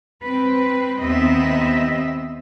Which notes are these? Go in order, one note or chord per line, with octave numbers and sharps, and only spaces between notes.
C4 B4
D#2 B3 C4 D#5 E5